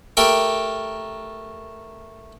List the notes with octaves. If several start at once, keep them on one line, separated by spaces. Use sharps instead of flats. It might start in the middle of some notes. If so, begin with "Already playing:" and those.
A3 G4 A#4 D6